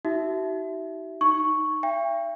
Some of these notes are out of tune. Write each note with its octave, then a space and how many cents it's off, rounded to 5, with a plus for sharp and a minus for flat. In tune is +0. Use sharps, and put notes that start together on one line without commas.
D#4 +45 F#4 +40 E5 +0
D#4 +0 C#6 +0
E5 +45 G5 +30